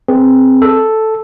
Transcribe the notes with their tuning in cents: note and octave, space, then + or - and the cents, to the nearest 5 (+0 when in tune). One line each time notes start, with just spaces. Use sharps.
C4 +0 G#4 +0 B4 -20
A4 +0 E6 +0